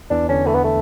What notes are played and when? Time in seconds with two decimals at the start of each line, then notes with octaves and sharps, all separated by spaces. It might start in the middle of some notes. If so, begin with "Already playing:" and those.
0.10 E2 E3 D4
0.29 D3 C#4 D4
0.46 E3 A3 E4
0.55 B3
0.64 A3